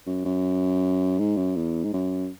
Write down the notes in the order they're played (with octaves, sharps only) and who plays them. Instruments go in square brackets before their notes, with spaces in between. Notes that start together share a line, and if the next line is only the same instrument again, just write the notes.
[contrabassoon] F#2
F#2
G#2
F#2
E2
G#2
F#2